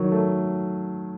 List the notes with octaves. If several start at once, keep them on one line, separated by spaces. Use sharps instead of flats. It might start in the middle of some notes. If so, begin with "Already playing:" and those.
Already playing: D#3 F#3
A3